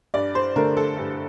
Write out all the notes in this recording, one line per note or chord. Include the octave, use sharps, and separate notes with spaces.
G2 D5
C5
D3 A3 A#4
A4
G2